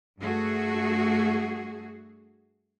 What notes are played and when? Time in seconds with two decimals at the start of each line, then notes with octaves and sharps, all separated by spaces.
0.19 G2 A3 F#4 G#4